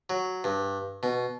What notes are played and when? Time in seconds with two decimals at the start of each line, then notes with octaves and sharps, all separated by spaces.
0.10 F#3
0.44 G2
1.03 B2